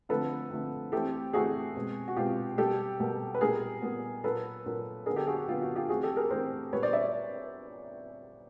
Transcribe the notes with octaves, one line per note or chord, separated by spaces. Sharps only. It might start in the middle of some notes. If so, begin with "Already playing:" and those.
D3 F3 A3 C4 A4 B4
D3 F3 A3 C4
E3 A3 C4 G4 A4
E3 A3 C4 F#4 G#4
B2 G#3 C4
F#4
B2 G#3 C4 F4 G4
B2 G3 A#3 G4 A4
B2 G3 A#3
B4
A#2 G3 B3 G#4 A#4
A#2 G3 B3
A#2 F#3 A#3 A4 B4
A#2 F#3 A#3
D3 F#3 B3 G#4 A#4
G4 A4
F#4 G#4
F#4
D3 F#3 B3 F4
F#4
F4 G4
E3 A3 C4 F#4 G#4
G4 A4
G#4 A#4
E3 A3 C4 A#4 C5
A#2 G3 B3 B4 C#5
C5 D5
D5 E5